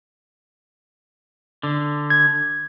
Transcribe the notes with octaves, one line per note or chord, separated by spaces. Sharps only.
D3
G#6